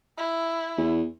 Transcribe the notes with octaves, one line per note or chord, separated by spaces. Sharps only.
E4
E2